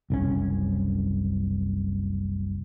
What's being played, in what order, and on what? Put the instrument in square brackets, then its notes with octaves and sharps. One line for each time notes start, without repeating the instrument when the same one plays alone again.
[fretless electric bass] F#1 C2 C#4